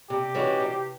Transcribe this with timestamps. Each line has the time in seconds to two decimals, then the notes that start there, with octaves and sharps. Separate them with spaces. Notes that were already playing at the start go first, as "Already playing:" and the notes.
0.10 C3 G4
0.35 E3 G#3 C#4 F#4
0.60 C3